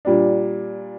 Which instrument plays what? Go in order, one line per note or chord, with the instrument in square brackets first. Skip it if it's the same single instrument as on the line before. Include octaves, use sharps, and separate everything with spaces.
[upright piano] A#2 G3 D4